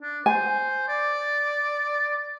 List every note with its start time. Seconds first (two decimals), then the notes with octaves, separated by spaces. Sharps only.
0.02 D4
0.26 C5 G#5
0.88 D5